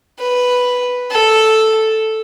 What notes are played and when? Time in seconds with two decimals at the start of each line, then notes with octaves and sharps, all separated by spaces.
0.19 B4
1.11 A4